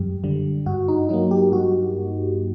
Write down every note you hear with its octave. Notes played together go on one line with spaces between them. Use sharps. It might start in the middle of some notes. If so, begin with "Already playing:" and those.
Already playing: F#2 G3 G4
D3 G3
G2 F#4
D#4
F#3 A#3 D#4
G4
G2 F#4